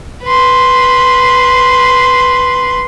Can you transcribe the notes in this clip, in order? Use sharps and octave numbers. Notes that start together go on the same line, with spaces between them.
B4 C6